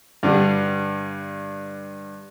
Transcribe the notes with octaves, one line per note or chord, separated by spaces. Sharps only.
G2 D3 G3